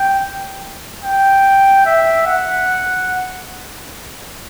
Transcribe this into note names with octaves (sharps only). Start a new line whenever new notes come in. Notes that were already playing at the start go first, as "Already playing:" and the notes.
Already playing: G5
G5
E5
F#5